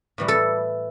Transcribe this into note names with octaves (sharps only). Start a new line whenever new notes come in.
A2 E3 G3
A4